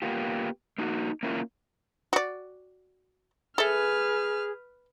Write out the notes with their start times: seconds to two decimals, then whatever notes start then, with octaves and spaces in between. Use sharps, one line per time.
0.02 A#3 B3 F4 G4
0.78 A#3 D#4 F#4
1.23 A#3 C#4 E4 F4 A#4
2.13 F#4 D5
3.58 G#4 A4 B4 E5 F6